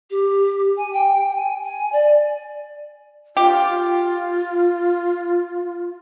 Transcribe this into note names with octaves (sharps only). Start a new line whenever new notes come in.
G4
G#5
G5
G#5
G#5
D5
F4 G4